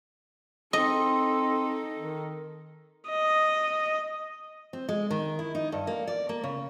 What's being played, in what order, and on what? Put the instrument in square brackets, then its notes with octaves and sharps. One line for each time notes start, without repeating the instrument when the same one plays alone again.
[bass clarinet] C4 [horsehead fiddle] D#4 A4 [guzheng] D#5
[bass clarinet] D#3
[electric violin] D#5
[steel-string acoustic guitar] C4
G#3
D#3
E4
D#4
G2
A#3
D5
A#3
C#3